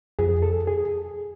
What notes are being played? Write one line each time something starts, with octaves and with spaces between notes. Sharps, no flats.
F2 G#4
A4
G#4